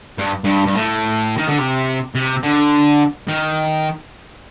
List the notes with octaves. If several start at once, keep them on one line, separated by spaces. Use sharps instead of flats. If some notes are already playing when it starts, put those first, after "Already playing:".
G2
G2
G2
A2
D#3
D3
C3
C3
D3
D#3